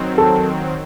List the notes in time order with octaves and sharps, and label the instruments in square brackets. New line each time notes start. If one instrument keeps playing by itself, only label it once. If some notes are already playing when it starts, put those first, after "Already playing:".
Already playing: [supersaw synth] D#3 F#3 C4
[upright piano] A4